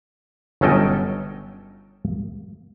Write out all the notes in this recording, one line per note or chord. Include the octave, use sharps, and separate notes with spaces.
G1 F#3 C#4 A4 D#5 G5